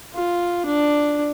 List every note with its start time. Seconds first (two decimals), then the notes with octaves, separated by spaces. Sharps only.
0.14 F4
0.66 D4